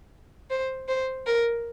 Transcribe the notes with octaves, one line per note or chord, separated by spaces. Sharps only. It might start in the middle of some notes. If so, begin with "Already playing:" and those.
C5
C5
A#4